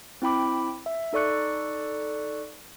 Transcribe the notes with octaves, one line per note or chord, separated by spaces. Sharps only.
C4 E4 G5 B5 D6
E5
D#4 A4 D5 C#6 F#6 C#7